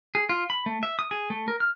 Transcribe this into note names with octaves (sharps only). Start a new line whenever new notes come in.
G#4
F4
B5
A3
E5
D#6
G#4
A3
A#4
F6